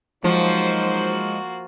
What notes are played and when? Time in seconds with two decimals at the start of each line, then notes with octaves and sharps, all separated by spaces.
0.24 F3 F#3 G#3 A#3 D#4 F#4 C5